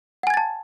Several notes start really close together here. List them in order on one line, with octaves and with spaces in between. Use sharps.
F#5 G#5 G#6 A6 A5